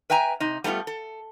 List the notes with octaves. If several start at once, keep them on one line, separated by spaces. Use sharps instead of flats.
B4 E5 G5 G#5 A#5
C3 D#4
G3 A3 B3 E4 F4
A4